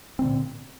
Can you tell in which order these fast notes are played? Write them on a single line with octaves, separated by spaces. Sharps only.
C4 D3 A#2